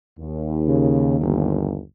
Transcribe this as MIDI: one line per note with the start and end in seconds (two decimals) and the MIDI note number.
0.20 1.82 39
0.68 1.20 49
1.21 1.79 31